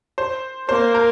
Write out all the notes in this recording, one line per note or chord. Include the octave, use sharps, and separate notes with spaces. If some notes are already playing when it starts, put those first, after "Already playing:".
C5
A#3 C5
A#4